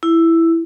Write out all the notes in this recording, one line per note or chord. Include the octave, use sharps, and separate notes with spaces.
E4